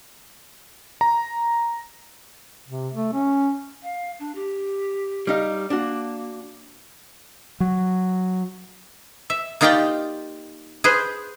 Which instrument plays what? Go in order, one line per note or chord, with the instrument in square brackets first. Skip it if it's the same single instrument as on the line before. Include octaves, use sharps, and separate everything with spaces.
[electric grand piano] A#5
[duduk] C3
A3
C#4
[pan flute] F5
D4
G4
[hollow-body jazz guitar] G3 D#4 F5
[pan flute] A#3 [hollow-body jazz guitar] D4 F#4
[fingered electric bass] F#3
[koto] E5
A#3 D#4 F4 G4 D5 G5
G#4 B4 C5